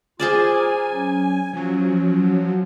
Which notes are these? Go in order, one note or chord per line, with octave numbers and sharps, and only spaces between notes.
F4 G#4 C5 D5 G#5 D6 F6
A#5
F#3 C#4
F3 F#3 C#4